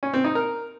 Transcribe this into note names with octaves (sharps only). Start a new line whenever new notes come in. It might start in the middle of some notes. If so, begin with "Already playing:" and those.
C#4
C4
D#4
A#4